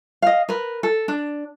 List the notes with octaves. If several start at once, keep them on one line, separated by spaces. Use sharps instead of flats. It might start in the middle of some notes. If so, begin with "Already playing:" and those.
D#5 F5
A#4 B4
A4
D4